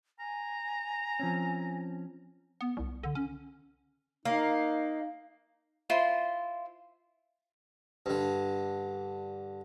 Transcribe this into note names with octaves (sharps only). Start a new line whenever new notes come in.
G#5 A#5
F3 C4 C#4
B3
C2
D3
C#4
A#3 D#4
E4 F4 C5
G2 D3